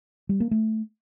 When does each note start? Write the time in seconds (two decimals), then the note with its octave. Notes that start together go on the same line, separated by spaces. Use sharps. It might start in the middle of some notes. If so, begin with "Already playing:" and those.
0.29 G3
0.40 A#3
0.51 A3